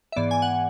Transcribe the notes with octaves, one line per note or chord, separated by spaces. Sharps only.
E5
G#2 E3 B3 D5
G#5
F#5